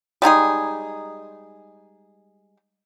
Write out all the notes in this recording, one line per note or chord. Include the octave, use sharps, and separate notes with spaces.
G3 G#3 D#4 G#4